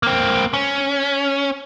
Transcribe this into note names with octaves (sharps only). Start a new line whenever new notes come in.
A#3 C4
C#4